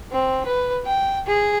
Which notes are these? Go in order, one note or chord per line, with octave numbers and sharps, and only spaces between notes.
C4
B4
G5
G#4